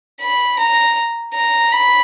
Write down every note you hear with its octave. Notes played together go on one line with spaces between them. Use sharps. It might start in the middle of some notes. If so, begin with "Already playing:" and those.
B5
A#5
A#5
B5